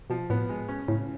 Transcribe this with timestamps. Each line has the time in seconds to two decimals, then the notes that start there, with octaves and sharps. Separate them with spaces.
0.10 B2 F3
0.30 A2 B3
0.49 G#3
0.69 C#4
0.88 A2 C#3